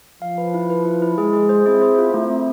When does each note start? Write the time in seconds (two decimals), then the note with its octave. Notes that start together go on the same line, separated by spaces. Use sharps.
0.21 F3 F5
0.38 B4
0.54 E4
0.70 B4
0.85 E4
1.02 E4
1.18 G#3 G#4
1.33 G#4
1.49 C5
1.65 C4 E4 G#4
1.82 C5
1.98 F4
2.13 A3 C4 E4
2.30 A3